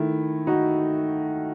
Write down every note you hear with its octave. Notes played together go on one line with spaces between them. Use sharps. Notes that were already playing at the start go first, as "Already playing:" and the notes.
Already playing: D#3 A3 E4
D#4 F#4